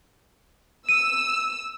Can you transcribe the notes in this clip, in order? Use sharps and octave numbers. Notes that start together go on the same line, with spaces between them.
E6 D#7